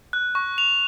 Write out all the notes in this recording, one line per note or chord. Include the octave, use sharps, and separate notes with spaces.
F#6
C#6
F7